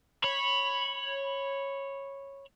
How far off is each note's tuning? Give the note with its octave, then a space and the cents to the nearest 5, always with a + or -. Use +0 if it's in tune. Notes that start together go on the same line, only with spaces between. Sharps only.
C#5 -10 B5 +0